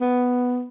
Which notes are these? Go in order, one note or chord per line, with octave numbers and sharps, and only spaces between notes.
B3